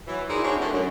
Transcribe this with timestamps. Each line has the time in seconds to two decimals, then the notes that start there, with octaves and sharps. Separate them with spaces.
0.07 E3 F#3
0.28 D#4 E4 G#4 A#4 C5 D5
0.44 G#3 C4 D4 F#4 C#5
0.61 D3 D#3 A3
0.73 F#2